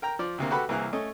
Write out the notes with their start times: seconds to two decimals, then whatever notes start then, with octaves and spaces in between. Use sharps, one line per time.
0.02 A#4 G5 A#5
0.19 F3 D5
0.38 D2 C3 A#3
0.51 F#4 G4 A4 B4 F#5 B5
0.69 C2 E3 A#3 G#4 A#4 F#6
0.93 A3 C#4 D#5